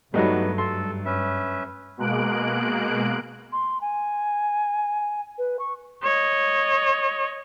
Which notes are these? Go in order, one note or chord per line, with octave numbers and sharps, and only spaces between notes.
G2 F#3 G3 A3 B3 D#4 F#4 B4
A4 C6
C#4 B4 E5
B2 G#3 A#3 F#6 D7
C6
G#5
B4
C#6
C#5 D#5